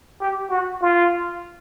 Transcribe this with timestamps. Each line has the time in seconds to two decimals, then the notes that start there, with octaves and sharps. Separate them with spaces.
0.20 G4
0.50 F#4
0.81 F4